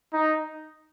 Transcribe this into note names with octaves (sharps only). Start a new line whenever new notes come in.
D#4